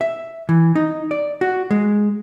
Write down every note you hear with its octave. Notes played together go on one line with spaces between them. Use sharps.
E5
E3
D#4
D5
F#4
G#3